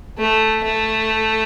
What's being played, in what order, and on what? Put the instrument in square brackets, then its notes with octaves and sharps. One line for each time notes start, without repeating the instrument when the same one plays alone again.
[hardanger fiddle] A3
A3